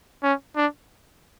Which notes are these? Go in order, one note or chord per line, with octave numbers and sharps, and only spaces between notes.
C#4
D4